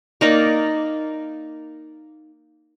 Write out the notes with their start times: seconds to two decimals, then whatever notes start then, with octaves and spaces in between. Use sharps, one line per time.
0.21 A#3 D#4 D5